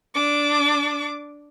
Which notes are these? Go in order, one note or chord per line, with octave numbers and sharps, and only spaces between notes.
D4 D6